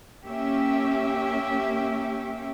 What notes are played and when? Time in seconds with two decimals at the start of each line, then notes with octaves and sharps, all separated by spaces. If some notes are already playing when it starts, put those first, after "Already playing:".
0.25 A#3 C#4 G4 E5